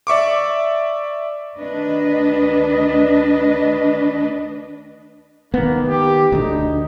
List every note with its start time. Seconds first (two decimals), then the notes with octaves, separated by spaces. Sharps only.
0.07 D5 E5 C#6 D6
1.57 D2 D#3 D4 B4 D#5
5.54 D#3 A#3 B3
5.88 G4
6.32 D2 D3 D#4